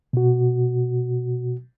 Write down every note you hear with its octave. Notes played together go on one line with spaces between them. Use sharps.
B2 F#4